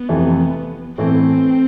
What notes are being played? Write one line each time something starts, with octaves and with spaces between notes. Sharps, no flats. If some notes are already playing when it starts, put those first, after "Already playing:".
Already playing: B3
F2 C3 E3 A3
A2 E3 A3 C4